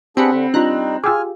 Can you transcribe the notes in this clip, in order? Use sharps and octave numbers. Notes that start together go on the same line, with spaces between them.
B3 C4 D4 G4 G#4 F#5 B5 C#7
D3
G3 D4 D#4 F4 A#5 F#6
F4 G4 G#4 G#5 D6 E6 F6